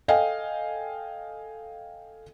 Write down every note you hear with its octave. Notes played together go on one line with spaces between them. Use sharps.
A4 D#5 F5 G5 G#5